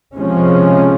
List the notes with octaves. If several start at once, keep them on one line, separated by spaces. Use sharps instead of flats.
C3 F3 G#3 C#4